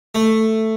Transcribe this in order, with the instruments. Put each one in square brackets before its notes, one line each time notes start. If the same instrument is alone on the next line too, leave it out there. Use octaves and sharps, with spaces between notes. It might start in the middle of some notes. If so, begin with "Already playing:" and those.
[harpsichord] A3